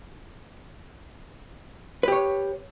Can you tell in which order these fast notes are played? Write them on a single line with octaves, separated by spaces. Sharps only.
B4 G4 C#5